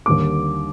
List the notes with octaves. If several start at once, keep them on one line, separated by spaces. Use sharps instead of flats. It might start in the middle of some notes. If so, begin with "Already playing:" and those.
D#2 D3 G3 A#3 D6